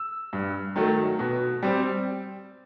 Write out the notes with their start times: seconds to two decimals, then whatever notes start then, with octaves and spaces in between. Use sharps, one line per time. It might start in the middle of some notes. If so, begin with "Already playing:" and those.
Already playing: E6
0.33 G2
0.76 D#3 F#3 A3
1.19 B2
1.63 G3 C4